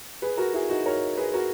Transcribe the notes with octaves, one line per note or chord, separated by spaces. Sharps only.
G#4 B4
F#4 A#4
E4 G#4
D#4 F#4
A#4 C#5
G#4 B4
F#4 A#4